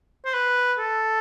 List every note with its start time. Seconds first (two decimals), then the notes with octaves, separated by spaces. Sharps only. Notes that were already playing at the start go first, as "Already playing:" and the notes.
0.25 C5
0.34 B4
0.79 A4